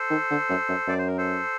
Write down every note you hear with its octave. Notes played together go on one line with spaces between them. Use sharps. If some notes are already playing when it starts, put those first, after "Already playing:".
Already playing: A4 C5
D#3
D3
F#2
F#2
F#2 D5
C5
A#4
A4 C5